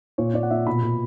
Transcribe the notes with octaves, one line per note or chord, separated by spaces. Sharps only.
A#2 C#5
A#2 D5
F#5
A#2 E5
B2 B5
B2